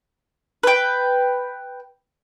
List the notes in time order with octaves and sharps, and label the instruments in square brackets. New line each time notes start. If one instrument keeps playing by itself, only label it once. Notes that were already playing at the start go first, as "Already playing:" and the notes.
[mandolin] B4 G5